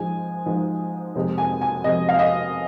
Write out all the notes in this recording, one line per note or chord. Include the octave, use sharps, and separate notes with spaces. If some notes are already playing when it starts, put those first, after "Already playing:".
Already playing: G#2 F3 G#3 G#5
G#2 F3 G#3
F2 C3 G#3
G#5
G#5
F2 C3 G#3 D#5
F5
D#5